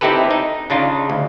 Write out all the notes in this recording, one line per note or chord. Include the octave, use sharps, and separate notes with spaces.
C4 D#4 E4 G4 A4 B4
D#4
C#3 D4 D#4 F4
D2